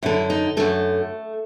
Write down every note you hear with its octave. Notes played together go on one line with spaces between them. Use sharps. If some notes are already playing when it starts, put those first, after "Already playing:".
F#2 D3 E4
D#4
F#2 D3 A3